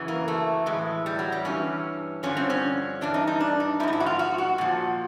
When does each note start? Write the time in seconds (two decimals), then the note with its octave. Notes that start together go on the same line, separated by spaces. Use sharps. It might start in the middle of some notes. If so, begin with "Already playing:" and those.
Already playing: F#2 C#3 E3
0.08 A#3
0.28 A3
0.66 A2 E3 G#3
1.06 G3
1.19 F#3
1.32 G3
1.45 G2 E3 C#4
2.23 G2 D3 F3 C#4
2.37 C4
2.50 C#4
3.01 G2 E3 D4
3.14 D#4
3.27 D#4
3.40 D4
3.60 D#4
3.80 F3 E4
3.83 G#2 D#4
3.93 E4
4.00 F#4
4.06 F4
4.19 F#4
4.38 F#4
4.58 A#2 F3